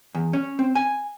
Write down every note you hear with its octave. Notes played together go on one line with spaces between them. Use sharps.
E2
C#4
C4
G#5